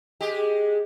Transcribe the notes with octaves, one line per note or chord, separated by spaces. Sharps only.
G#3 G4